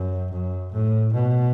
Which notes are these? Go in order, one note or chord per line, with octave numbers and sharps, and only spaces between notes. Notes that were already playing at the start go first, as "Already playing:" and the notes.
Already playing: F#2
F#2
A2
B2